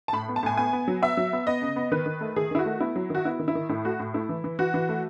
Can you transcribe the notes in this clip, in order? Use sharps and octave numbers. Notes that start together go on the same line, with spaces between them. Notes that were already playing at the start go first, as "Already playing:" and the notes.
A5
A2 B5
B3
A5
A2 G#5
B3 G#5
B3
F#3
B3 E5
F#3
B3
B3 D#5
C#3
B3
D#3 B4
D#3
A3
D#3 G#4
D#3 E4
F#4
A3
B3 E4
F#3
D#3 F#4
B3 E4
D#3
E4
D#3
A2 E4
A3 F#4
A2
A3 E4
E3
E3
E3 F#4
E3
A3